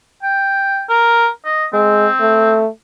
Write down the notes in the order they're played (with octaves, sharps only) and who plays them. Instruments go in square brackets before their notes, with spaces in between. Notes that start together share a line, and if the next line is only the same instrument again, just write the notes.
[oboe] G5
A#4
D#5
[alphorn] G#3 [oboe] C4
[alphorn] A3